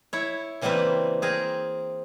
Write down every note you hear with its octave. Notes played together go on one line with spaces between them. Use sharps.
E4 C#5
C#3 E3 G3 A#3 C4 B4
C4 G#4 A#4